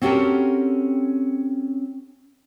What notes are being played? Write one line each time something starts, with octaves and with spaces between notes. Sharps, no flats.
C4 C#4 F#4 G4 A4 A#4